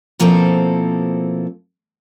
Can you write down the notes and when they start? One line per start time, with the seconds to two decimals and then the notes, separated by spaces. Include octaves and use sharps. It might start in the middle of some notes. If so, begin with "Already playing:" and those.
0.19 B2 F3 A#3 C4 E4 A4